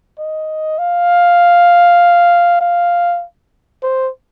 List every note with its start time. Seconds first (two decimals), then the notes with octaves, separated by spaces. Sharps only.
0.18 D#5
0.78 F5
2.61 F5
3.82 C5